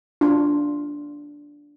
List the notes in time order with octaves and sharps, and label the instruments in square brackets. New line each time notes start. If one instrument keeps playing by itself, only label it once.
[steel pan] D4 F4